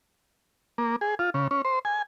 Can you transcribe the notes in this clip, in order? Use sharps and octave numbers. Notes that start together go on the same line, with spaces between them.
A#3
G#4
F4
C#3
C#4
C5
G#5